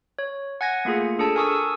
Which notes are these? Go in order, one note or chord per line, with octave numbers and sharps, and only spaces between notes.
C#5
F#5 G#5 G#6 A#6
A3 A#3 F4 G#4
D4 G#4 A4 A5
A#4 G#5 A5 C#6 D#6 E6